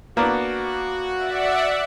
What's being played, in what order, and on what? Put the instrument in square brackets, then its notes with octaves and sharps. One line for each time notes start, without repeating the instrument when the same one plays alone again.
[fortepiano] A#3 B3 D4 [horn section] F#4
[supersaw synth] D5 E5 F#5